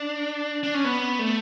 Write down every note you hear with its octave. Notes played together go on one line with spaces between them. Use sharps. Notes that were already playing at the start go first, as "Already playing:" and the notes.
Already playing: D4
D4
C#4
B3
A3